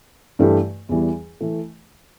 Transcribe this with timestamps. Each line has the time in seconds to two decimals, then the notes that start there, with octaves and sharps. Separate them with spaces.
0.39 G2 E3 A3 G4
0.89 E2 E3 G3
1.41 E3 A3